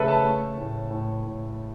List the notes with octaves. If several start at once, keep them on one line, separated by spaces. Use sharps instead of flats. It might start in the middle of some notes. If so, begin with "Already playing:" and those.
Already playing: C#3 A3 A4 B4 E5
A5
A3
A2
A2
A2